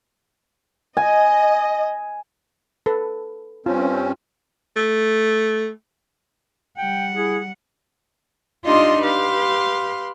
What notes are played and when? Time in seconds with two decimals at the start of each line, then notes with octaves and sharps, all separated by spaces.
0.97 D#5 G#5
2.86 A4 B4
3.66 G2 C4 C#4 F4
4.76 A3
6.78 G3 F#5 G5
7.14 E4 G#4
8.66 D4 D#4 F4 G4 D#5 C6
9.01 G4 B4 F5 C6